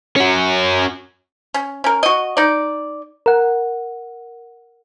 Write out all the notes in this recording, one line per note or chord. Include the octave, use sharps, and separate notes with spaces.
C#4 F#4
C#4
C#4 A#4
F#4 D#5
D#4 D5
A#4 F#5